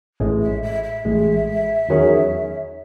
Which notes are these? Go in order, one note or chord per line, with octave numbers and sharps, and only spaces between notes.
A1 A2 G#3
E5
E5
E5
A1 A2 G#3
E2 D#3 F#3 C#4 G#4